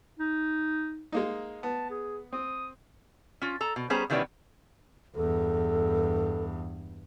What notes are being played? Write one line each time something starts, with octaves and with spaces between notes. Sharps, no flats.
D#4
G#3 A#3 D#4
B3 A5
G#4
C4 D#6
C#4 F4
A4 A#5
B2
G3 B3 C#4 G#4 C5 A#5
B2 D#3 E3 G3 B3 C#4
E2 G2 A4